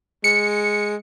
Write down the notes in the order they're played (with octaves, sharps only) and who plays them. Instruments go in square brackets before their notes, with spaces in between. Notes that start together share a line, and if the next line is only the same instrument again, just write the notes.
[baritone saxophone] G#3 [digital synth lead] C#7